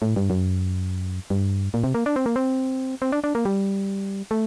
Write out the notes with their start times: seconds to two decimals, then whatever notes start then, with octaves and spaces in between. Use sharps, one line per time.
0.02 A2
0.16 G2
0.30 F#2
1.30 G2
1.74 A#2
1.84 C3
1.94 A#3
2.06 D4
2.16 C4
2.26 A#3
2.36 C4
3.02 C4
3.12 D4
3.24 D4
3.35 A#3
3.45 G3
4.31 A3